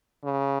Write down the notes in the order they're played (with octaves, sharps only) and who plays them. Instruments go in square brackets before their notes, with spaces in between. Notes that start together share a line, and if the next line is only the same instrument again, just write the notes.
[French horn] C#3